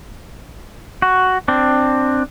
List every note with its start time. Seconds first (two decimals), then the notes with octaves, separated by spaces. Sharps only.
1.02 F#4
1.48 C4 D4